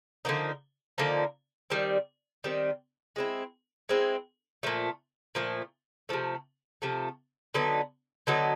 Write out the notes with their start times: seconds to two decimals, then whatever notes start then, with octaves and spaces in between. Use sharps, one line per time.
0.25 D3 F3 A#3 D#4
0.98 D3 F3 A#3 D#4
1.70 D#3 G3 C4
2.44 D#3 G3 C4
3.16 G#3 C4 E4
3.89 G#3 C4 E4
4.63 A#2 F3 A3
5.35 A#2 F3 A3
6.09 C3 F3 A3
6.82 C3 F3 A3
7.54 D3 F#3 B3 D#4
8.27 D3 F#3 B3 D#4